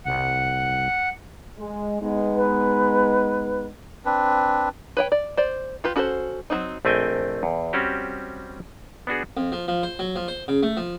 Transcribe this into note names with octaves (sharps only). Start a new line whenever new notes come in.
C2 F#5
G#3
G#3 B3 D#4
B4
C4 D4 B4
B4 C#5 G5
D5
C5 D5
F4 G4 B4
C#4 F#4 A4 B4 C5
F#3 C4 D#4
A#1 A3 C4 D#5 G5 G#5
E2
G3 C4 C#4 F#4 G4
B3 D4 F#4 G#4
F2
F3
F3
C5
F#3
F3
C5
C#3
A3
F3